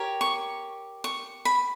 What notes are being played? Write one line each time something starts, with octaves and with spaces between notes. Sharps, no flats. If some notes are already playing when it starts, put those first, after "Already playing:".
Already playing: G4 A#4 C#5
C#6
C#6
B5